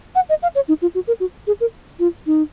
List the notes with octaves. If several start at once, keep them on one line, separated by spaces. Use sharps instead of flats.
F#5
D#5
F5
C#5
D#4
F4
F#4
A#4
F#4
G#4
A#4
F4
D#4